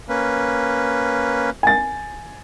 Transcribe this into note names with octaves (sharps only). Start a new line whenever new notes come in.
A#3 C#4 B4
G#5 A6